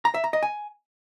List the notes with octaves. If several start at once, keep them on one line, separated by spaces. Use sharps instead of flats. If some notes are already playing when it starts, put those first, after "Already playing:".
A#5
E5
A#5
D#5
G#5